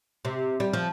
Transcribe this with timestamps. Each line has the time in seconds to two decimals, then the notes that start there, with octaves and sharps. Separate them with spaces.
0.25 C3
0.60 G3
0.73 F3